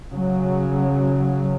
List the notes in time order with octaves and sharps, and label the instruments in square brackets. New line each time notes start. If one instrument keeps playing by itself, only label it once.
[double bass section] C#3 F#3